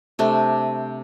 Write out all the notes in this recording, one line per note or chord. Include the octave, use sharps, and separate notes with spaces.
C3 A3 D4